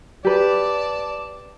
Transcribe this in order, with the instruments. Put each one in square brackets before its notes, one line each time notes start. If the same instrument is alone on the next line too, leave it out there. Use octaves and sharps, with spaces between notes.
[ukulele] G4 B4 [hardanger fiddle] D5 A5